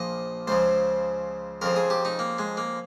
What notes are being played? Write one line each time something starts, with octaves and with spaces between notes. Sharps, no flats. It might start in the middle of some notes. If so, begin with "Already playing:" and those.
Already playing: A#1 A#2 F3 D#5
C#2 C#3 F3 C5
F2 C#3 F3 A#4
G#4
G4
D#4
A#3
G#3
A#3